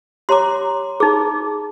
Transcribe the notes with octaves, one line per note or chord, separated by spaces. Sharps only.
G4 C#5 A#5 C6 D6
D#4 G#4 D6